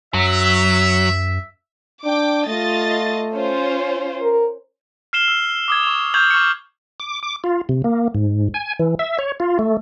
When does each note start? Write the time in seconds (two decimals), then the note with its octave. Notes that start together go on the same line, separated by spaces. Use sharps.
0.14 F#2 F#3 E5
2.05 D4 G5 D6
2.48 A3 F4 D#5 A6
3.33 C#4 F4 C5
4.22 A#4
5.13 F6 C7 E7 G7
5.28 E6
5.68 D6 D#6 G#6
5.83 C#6 F7
6.14 C#6 F6 G6 G#6 F7 F#7
6.31 C#6 F6 C#7
7.00 D6
7.23 D6
7.44 F4
7.69 C3
7.84 A#3
8.15 G#2
8.54 G#5
8.79 E3
8.99 E5
9.19 C#5
9.40 F4
9.59 A3